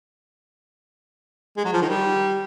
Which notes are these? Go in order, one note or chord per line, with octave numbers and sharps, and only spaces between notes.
G#3
F#3
F3
D#3
G3